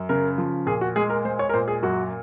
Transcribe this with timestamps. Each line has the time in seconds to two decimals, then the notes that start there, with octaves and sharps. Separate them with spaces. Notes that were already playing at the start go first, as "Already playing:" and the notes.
Already playing: F#2
0.09 C#3 A#4
0.38 F3
0.66 A#2 G#4
0.81 F#4
0.96 G#3 G#4
1.10 A#4
1.25 G#3 C5
1.39 C#5
1.49 A#4
1.54 A#2 C5
1.68 G#4
1.82 F#2 F#4